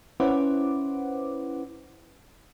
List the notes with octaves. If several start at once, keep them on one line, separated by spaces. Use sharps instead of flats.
C#4 E4 B4 C5 F#5 D6